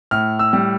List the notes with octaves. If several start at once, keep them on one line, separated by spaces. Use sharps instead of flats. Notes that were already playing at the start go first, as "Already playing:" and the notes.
A2 F6
E6
G3